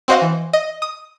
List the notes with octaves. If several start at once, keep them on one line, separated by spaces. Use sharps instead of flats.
C4 F#4 C5 D#5 F5 F#5
E3
D#5
D#6